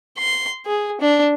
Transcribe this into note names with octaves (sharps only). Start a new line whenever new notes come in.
C6
G#4
D4